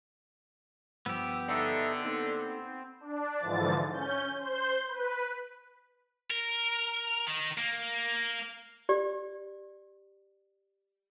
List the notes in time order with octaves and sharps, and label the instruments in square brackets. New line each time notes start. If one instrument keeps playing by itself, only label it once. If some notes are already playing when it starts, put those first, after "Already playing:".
[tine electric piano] G2 F3 G3 [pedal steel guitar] B3 G4 [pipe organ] E6
[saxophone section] D3 [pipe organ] D#4 A4 E5
[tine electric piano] A#3 D#4 A4 [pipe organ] C4
[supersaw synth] D4
G#2 D3 E3 F3 A6
C#4 G6
C5 G6
B4
[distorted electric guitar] A#4
D#3
A#3
[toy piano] G4 D5